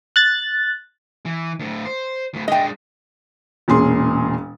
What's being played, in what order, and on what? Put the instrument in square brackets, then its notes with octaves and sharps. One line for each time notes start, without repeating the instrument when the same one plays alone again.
[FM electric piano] F#6 A6
[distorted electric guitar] E3
D2 A2
C5
D2 A2
[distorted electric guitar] G#3 D4 [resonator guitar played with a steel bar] D#5 G5
[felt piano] E1 A#2 C#4 G#4 C6